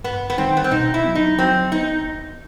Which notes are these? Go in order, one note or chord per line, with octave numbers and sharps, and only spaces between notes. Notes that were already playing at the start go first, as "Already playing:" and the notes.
G2 B3
B3
D#3 G3 C4 D#4
B3
C4
B2 D#4
E4
F#3 B3
D#4
F#3 C4
B3 D#4